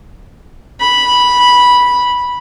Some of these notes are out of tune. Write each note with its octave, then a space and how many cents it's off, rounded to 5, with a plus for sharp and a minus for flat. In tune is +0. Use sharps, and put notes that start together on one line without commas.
B5 -10